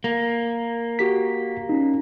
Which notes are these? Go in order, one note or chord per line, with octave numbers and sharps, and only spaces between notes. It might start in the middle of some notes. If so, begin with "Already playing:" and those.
A#3
F#4 G4 B6
C#4 D#4